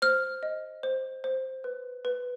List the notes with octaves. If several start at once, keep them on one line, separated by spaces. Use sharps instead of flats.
C5 F6
D#5
C5
C5
B4
B4